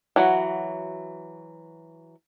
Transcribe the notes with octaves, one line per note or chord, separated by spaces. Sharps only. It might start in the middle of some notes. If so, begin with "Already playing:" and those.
E3 F#3 F#4